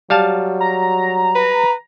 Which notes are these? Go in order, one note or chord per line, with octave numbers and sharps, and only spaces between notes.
F#3 G3 F5 A5
A#5
B4